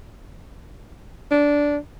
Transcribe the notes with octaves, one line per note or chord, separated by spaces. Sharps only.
D4